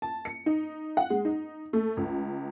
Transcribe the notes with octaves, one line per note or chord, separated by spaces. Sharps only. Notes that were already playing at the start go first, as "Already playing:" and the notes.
A5
C#7
D#4
F#5
G#3
D#4
A3
C#2